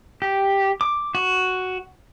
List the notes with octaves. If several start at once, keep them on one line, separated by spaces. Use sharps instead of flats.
G4
D6
F#4